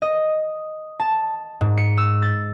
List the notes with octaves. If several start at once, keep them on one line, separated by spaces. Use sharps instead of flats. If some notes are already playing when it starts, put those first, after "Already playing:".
D#5
A5
G#2
C#7
E6
A6